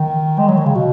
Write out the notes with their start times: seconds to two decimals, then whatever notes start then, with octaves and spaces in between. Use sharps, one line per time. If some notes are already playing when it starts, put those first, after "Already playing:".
Already playing: D#3
0.39 G#3
0.48 F#3
0.57 D#3
0.66 C#3
0.75 B2